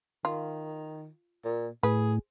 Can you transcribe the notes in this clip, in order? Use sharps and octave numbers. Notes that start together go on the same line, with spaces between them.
D#3 F4
A#2
A2 G#4 B4